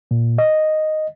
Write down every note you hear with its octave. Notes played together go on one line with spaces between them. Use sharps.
A#2
D#5